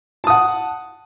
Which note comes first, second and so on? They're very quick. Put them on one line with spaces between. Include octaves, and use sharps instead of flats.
A5 D#6 F#5